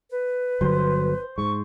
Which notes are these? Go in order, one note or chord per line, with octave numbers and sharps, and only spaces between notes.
B4
G1 D3 F#3 C5
G#2 C#6